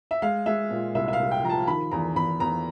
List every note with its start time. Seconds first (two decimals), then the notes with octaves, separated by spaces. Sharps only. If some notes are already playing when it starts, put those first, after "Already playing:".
0.11 E5
0.22 G#3 F5
0.46 G#3 E5
0.71 A#2
0.95 C2 E5
1.08 E5
1.13 F5
1.19 C2
1.31 G5
1.44 F3 A#5
1.49 A5
1.67 D#3 B5
1.91 E2 A#5
2.16 E2 B5
2.40 E2 A#5